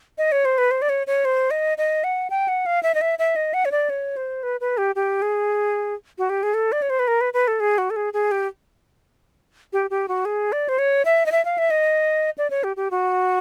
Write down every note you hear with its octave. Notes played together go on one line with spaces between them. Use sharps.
D#5
C#5
C5
B4
C5
D5
C#5
C#5
C5
D#5
D#5
F#5
G5
F#5
F5
E5
D#5
E5
E5
D#5
F#5
C#5
D5
C#5
C5
B4
B4
G4
G4
G#4
F#4
G4
G#4
A4
D5
C#5
C5
B4
A#4
B4
B4
A4
G#4
F#4
A4
G#4
G#4
G4
G4
G4
F#4
G#4
D5
C5
C#5
E5
D#5
E5
F5
E5
D#5
D5
C#5
G4
G4
F#4